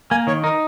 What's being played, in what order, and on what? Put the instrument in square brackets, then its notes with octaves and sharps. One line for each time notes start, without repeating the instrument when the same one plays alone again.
[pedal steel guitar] A#3 [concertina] G#5
[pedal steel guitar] D#3 [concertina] C#5
[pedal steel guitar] D#4 [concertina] A#4